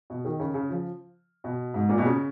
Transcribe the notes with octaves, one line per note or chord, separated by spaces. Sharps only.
B2
D#3
C#3
C#3
F3
B2
G#2
A#2
B2
C#3